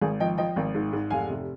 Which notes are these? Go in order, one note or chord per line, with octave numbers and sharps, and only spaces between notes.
G#1 G#4
F3 D#5 G5
F3 D#5 G5
G#1
G#2
G#2
F1 F5 G#5
C3